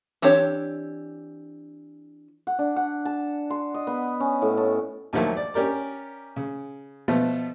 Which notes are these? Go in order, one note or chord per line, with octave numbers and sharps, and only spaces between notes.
E3 C4 D4 G4 C#5
F#5
D4
F#5
A5
C6
D#5
B3
C#4
A2
A5
D#2 D#3 F3 F#3 A3 A#3
D5
C#4 G4 A#4 D5
C#3
B2 F3 A3 B3